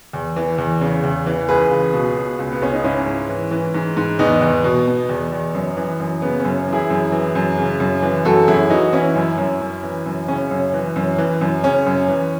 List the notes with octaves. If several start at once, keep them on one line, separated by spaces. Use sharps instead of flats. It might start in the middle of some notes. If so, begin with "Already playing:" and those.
E2
E3
E2
C#3
E2
E3
C#2 G#4 B4
C#2
B2
B2
C#2
B3
C#2 C#4
D#4
G#2 C#4 E4
G#2
E3
E3
G#2
G#2
E2 B3 D#4
E2
B2
B2
E2
E2
F#2
E3
F#2
C#3 B3
C#4
F#2
E3
E4 G#4
F#2
E3
F#2
C#3
F#2
E3
F#2 F#4 A4
F#2 E4 G#4
E3 D#4 F#4
E3 C#4 E4
F#2
F#2
F#2
E3
F#2
C#3 C#4
F#2
E3
F#2
E3
F#2
C#3 C#4
F#2
E3